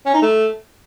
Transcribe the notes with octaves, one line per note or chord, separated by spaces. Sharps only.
C#4
D#4
A3